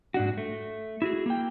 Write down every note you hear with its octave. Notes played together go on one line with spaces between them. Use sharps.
G#2 D4 F#4
A3
E4 F#4 G#4
A#3 G5